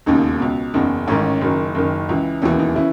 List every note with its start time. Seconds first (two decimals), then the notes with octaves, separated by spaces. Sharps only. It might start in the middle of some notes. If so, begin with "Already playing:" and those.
0.06 E1 D#2 C#3 D#4
0.40 C#2 B2
0.74 F#1 E2 C#3 D#4
1.08 A1 G#2 D#3 C#4
1.41 F#1 F#2 D#3
1.75 F#1 F#2 D#3
2.09 C#2 C#3 E3
2.42 E1 D#2 C#3 E3 C#4
2.59 D#4
2.76 C#3 E3 C#4 E4